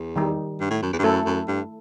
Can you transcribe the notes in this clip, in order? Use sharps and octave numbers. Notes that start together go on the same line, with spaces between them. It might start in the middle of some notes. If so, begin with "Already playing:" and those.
Already playing: E2
D#3 G3 D#4
G2
A2
F#2
E2
G2
F#2 A3 E4 A4
F#2
G2